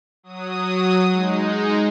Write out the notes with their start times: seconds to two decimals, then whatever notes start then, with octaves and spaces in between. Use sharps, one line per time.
0.23 F#3 D#6
1.10 G#3 D#4